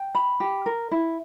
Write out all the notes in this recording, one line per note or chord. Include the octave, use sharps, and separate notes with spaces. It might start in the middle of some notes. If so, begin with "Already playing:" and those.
Already playing: G5
B5
G4
A#4
E4